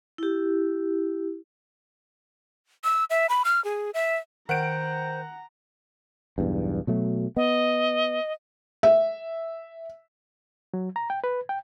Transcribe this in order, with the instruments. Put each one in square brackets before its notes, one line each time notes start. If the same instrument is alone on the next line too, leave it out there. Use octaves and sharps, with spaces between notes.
[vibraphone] E4 G4
[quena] E6
E5
B5
F6
G#4
E5
[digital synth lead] D#3 [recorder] C5 [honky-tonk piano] F#5 D7 [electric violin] A#5
[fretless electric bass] B1 E2 G2
B2 F#3 A3
[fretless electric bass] B3 [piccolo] D#5
[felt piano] E5
[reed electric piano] F#3
A#5
G5
B4
G5